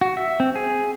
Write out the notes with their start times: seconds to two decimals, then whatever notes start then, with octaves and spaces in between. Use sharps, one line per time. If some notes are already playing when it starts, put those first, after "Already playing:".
0.01 F#4
0.17 E5
0.40 C4
0.55 G#4